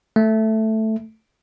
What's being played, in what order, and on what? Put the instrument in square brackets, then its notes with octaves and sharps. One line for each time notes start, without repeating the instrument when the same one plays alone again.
[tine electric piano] A3